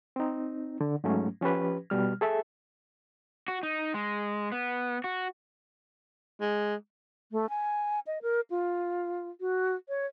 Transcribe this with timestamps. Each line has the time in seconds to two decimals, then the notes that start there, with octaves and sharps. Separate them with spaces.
0.16 C4 D#4
0.81 D3
1.04 G#2 F#3 A3 C#4
1.41 F3 C#4 G4 B4
1.90 B2 G3 F6
2.21 G#4 A4 E5
3.48 F#4
3.63 D#4
3.94 G#3
4.52 B3
5.04 F#4
6.40 G#3
7.32 A3
7.49 G#5
8.07 D#5
8.22 A#4
8.50 F4
9.41 F#4
9.89 C#5